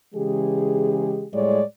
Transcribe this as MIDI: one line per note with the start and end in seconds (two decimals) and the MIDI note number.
0.14 1.26 49
0.14 1.26 52
0.14 1.26 56
0.14 1.26 67
0.14 1.26 68
1.33 1.62 45
1.33 1.62 55
1.33 1.62 56
1.33 1.62 73
1.33 1.62 74